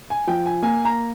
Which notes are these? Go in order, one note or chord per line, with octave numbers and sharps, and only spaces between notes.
G#5
F3 G5
G#5
A#3 G#5
A#5